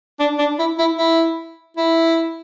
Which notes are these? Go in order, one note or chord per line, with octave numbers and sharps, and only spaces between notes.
D4
D4
E4
E4
E4
E4